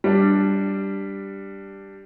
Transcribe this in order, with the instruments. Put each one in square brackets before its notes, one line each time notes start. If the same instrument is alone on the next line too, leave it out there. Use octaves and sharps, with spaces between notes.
[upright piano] G3 D4